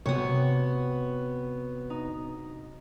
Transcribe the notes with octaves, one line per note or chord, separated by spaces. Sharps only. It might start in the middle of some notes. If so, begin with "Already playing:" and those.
C3 B3 F#4 C#5
D#4